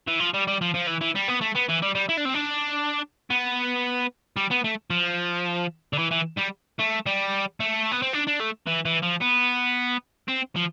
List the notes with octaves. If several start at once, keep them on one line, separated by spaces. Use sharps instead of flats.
E3
F3
G3
G3
F3
F3
E3
E3
G3
B3
A3
B3
E3
G3
G3
E4
D4
C4
D4
B3
G3
B3
A3
F3
D3
E3
E3
G3
A3
G3
A3
B3
C4
D4
D4
A3
E3
E3
F3
B3
C4
F3